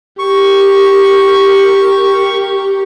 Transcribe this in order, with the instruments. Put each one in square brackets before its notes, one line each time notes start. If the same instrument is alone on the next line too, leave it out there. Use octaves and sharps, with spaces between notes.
[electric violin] G4 A#4 [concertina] C#6